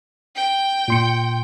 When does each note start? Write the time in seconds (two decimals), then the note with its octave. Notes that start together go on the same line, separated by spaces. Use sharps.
0.36 G5
0.88 A#2 C6 C#7